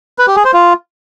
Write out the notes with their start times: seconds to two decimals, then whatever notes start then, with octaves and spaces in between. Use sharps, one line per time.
0.18 B4
0.27 G4
0.36 G#4
0.45 C5
0.53 F4